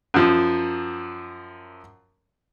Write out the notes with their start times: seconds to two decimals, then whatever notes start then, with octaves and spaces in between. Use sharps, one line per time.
0.14 F#2 F3